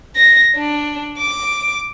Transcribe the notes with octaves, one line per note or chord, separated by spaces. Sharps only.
A#6
D4
D6